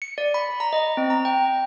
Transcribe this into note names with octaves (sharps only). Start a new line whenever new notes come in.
C#7
D5
B5
A#5
D#5
C4
A#5
G5